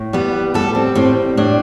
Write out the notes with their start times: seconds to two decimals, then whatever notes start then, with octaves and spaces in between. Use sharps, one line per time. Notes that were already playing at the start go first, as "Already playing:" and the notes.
Already playing: A2
0.13 G3 B3
0.54 G3 A4
0.75 C4
0.95 A2 C4
1.37 A2 D4